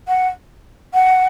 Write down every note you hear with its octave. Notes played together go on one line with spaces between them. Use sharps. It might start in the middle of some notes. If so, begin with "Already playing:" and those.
F#5
F#5